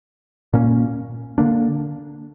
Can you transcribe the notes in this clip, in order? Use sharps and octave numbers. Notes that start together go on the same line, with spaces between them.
A#2 A#3 C#4
D3 A#3 D4